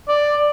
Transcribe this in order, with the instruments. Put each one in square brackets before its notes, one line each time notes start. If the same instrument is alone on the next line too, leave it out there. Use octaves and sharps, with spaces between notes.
[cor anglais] D5